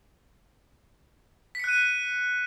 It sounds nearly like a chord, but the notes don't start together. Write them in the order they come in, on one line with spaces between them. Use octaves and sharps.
B6 C#7 F#6 D#7